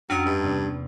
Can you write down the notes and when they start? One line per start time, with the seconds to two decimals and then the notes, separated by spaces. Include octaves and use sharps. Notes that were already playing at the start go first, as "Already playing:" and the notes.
0.10 F2 F#3 C#4 D4
0.26 G2 D#5 E5 A#5
0.43 E2 C3 A#3